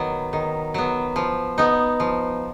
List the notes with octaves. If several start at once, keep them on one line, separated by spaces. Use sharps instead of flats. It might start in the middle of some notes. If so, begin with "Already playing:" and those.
Already playing: D#3 F#3 B3
D#3
F#3 B3
F3
B3 D#4
F3